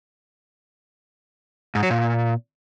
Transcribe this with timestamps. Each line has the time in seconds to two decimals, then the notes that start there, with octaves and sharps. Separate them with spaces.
1.75 G#2
1.83 F#3
1.90 A#2